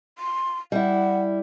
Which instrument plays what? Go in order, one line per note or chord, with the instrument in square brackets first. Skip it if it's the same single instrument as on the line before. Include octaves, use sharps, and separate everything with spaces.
[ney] C6
[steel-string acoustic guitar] G3 E4 [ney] F#5